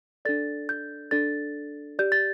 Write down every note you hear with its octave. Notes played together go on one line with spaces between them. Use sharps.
D4 A4 D5 A6
G6
D4 A4 D5 A6
G4 D5 G6
A6